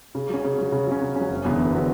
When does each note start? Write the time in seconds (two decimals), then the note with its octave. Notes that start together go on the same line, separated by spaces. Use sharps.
0.15 C#3
0.29 F#3 C#4
0.44 C#3
0.58 F#3 C#4
0.72 C#3
0.87 F#3
0.92 C#4
1.01 C#3
1.16 F#3 C#4
1.30 F#1
1.45 E2 D3 F#3 B3
1.59 F#1
1.74 D3 F#3 B3